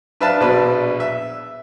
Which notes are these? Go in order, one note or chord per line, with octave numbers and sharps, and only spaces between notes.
D4 B4 E5 F5 A5
A#1 B2 B4 D5
E5